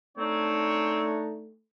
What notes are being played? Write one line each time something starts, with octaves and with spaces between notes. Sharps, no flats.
A3 C4 D4 D#4 C#5